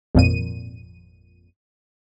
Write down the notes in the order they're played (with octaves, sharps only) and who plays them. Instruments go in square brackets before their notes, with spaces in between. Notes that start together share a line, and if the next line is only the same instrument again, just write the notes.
[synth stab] G#1 F2 A#2 D#7